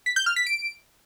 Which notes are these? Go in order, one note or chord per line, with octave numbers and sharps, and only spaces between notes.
B6
G6
F6
B6
D7